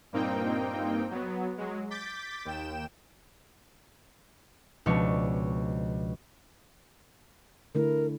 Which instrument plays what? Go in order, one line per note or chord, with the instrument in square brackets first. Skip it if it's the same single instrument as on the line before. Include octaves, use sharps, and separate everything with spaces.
[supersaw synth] G2 A#2 A#3 C4 D#4 G5
F#3 B3
F#3 G#3
D6 G6 A6 B6
D#2 G5 E7
[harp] C#2 B2 F3 C#4 D4 C#6
[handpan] D3 A3 E4 [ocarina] A#4